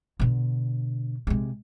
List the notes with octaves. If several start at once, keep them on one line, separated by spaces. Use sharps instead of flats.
B2 D3
C3 G#3